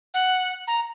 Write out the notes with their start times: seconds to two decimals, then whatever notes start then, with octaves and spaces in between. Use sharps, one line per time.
0.14 F#5
0.67 A#5